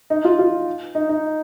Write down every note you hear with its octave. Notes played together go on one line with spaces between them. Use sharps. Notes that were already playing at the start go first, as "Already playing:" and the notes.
D#4
F4
F4
D#4
D#4